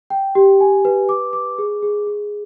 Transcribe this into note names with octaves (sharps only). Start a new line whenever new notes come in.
G5
G4
G#5
B4
D6
D6
G#4
G#4
G#4